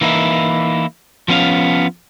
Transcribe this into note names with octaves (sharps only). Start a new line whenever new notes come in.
E3 A#3 D#4 E4
F3 B3 C#4 B4 F5